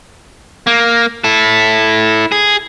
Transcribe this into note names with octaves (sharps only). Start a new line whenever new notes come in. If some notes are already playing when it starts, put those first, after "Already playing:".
A#3
E4 A4
G#4